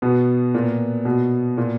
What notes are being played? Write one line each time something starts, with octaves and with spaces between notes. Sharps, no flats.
B2 B3
A#2
B2
A#2